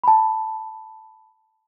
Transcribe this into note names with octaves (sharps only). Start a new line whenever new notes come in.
A5 B5